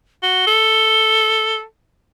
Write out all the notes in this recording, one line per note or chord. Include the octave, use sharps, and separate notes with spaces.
F#4 G7
A4